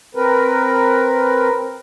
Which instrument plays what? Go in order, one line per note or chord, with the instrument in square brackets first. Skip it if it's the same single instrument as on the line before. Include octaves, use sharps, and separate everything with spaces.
[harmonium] C4 A#4 B4